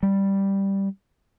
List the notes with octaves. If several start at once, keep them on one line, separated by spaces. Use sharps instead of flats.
G3